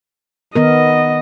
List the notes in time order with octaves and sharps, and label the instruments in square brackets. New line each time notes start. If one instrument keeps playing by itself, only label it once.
[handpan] D#3 B3 A#4 [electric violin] D#5